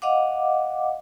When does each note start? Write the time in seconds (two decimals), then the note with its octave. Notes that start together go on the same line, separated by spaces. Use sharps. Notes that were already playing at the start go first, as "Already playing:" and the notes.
0.02 D#5 F5 F#5 D6